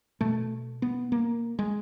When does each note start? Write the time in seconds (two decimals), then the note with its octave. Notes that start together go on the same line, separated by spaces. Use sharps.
0.21 B2 A3
0.82 B3
1.12 A#3
1.59 G#3